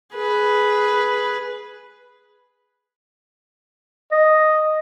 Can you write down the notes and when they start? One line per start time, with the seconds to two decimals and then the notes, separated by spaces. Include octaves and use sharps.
0.15 G#4 B4
4.12 D#5